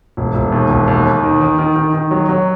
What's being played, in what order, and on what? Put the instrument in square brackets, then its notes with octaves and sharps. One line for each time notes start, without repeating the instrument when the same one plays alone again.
[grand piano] E1
E1
D#2
E1
D#2
D#2
D#3
D#3
D#3
D#3
D#3
F#3
F#3